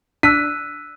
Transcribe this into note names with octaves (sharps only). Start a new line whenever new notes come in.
D4 E6 F#6 B6 D#7